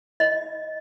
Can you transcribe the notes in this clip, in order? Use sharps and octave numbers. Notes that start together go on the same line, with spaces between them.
D#5